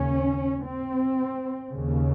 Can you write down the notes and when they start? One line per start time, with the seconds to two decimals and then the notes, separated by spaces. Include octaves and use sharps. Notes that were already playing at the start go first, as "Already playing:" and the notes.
Already playing: D#2 C#3 C#4
0.64 C4
1.69 D#2 C#3